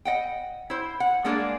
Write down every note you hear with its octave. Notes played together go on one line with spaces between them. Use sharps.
D#5 F#5 G5
E4 C5
F#5
G3 G#3 A#3 D4 G#4 D5